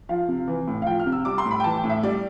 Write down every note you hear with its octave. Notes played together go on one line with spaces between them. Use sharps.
F3 F5
C3
E3
A2
F5
F3 G5
F6
C3
E6
G3 D6
C6
A2
B5
G5
E3 A5
G5
A2
E5
G3 D5